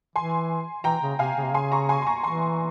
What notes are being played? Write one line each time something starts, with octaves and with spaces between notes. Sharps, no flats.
E3 G#5 C6
E3 G5 A#5
C#3
C3 F5 G#5
C#3
C3
C#3 G#5 C6
A#5 C#6
G#5 C6
C6
A#5 C#6
E3 G#5 C6